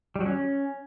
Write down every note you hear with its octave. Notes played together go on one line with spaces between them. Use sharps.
G3
F#3
C#4